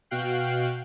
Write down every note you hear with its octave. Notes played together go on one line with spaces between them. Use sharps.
B2 F#4 F5 G5 F#6 C7